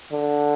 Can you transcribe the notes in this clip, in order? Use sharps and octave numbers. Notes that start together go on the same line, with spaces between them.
D3